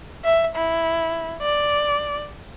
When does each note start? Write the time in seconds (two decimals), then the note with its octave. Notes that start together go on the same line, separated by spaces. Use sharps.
0.24 E5
0.55 E4
1.42 D5